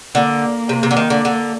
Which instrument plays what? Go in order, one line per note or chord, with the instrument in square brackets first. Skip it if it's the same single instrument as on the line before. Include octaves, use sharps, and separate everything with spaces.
[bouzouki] D3 [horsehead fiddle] A#3
[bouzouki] C3
C3
D3
D#3
D3
D3